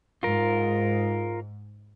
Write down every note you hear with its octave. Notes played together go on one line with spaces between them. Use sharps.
G#2 F4 A#4